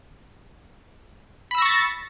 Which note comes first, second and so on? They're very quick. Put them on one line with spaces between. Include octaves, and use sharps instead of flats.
B5 E6 A#6 C#6 A6